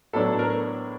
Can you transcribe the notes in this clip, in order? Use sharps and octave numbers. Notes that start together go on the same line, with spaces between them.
A2 F#3 B3 D4 A4
A#4